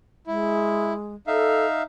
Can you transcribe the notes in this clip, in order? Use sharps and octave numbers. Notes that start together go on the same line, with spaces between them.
G#3 E4
D#4 A4 E5 F5